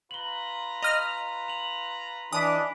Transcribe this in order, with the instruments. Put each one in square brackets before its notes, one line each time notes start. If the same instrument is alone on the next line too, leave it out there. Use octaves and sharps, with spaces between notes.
[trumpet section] F4 B4 A#5 [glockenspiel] F#7 G7
[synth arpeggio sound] D#5 F6 [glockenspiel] F7
[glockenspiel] F7 F#7
[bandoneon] E3 D4 [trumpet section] D#5 D6 [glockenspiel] G#5 B5 B6 [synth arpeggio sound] D#6